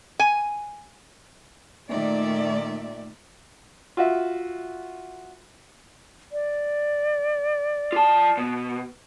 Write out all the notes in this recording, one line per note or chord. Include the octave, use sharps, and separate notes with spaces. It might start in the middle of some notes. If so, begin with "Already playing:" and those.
G#5
A#2 D#3 A3 D5 E5
F4 F#4 E5
D5
F4 A5
B2